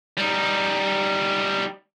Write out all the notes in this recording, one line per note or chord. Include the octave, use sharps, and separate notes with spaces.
G3 D#4